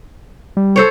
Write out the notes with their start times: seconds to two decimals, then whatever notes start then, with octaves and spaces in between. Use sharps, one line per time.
0.57 G3
0.76 A4 C5 C#5